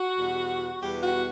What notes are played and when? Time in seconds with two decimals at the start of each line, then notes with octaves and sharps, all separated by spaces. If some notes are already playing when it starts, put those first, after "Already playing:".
Already playing: F#4
0.17 E2 B2 G3 B3
0.82 E2 B2 G3 B3 G4
1.03 F#4